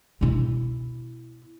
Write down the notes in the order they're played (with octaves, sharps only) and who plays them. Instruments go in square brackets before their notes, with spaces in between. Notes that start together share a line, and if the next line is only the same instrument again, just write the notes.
[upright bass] B2 E4